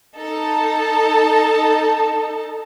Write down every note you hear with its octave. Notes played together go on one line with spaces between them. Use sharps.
D#4 A4 A5